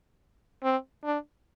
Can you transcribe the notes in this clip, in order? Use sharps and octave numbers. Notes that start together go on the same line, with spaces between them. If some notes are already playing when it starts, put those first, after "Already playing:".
C4
D4